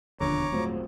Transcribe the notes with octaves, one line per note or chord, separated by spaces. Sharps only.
E1 D#2 D3 F3 C#5 A#5 D6
D#1 G#2 F3 F#3 A3 C4